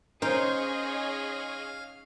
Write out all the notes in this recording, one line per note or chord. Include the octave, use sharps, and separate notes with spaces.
C#4 D#4 G#4 A#4 C5 C#5 D#5 F5